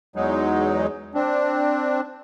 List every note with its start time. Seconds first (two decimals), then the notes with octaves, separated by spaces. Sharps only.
0.16 E2 F#3 G#3 D#4
1.15 C4 D4